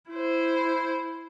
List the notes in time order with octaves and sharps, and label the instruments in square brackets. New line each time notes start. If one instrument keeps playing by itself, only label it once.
[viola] E4 C5